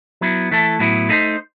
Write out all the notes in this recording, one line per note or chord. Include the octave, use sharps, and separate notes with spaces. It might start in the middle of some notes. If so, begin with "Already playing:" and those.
F#3 B3 E4
E3 A3 E4 A4
A2 F#3 B3 E4
A3 D#4 A4 C5